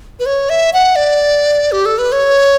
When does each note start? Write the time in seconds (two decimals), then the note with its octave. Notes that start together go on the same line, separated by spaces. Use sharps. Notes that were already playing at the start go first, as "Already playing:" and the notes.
0.19 B4
0.26 C#5
0.50 E5
0.73 F#5
0.96 D5
1.72 G4
1.86 A4
1.98 B4
2.12 C#5